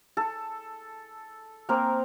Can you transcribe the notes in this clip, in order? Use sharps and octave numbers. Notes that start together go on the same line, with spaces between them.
A4
A#3 C4 A#4